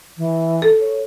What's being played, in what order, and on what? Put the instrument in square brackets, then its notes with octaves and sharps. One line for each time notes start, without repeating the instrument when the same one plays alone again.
[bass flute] E3
[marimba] A4
[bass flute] C#5